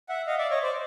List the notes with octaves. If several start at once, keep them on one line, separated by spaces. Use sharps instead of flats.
E5 F#5
D#5 F5
D5 E5
C#5 D#5
C5 D5